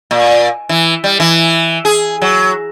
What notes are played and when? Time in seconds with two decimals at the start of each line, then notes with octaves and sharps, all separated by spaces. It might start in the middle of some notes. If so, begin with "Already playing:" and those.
0.11 A#2
0.69 E3
1.04 G3
1.20 E3
1.85 G#4
2.22 F#3